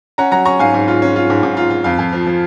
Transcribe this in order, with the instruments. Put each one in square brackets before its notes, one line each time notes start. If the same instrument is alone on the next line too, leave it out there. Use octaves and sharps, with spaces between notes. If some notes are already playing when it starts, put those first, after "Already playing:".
[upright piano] C#4 F#5 A#5
F#3 F#5 A#5
C#4 A#5 C#6
G#2 F5 G#5
G#2
F4
C#4
F4
G#2
G#2
F4
F4
F2 F5
F2
F3
F3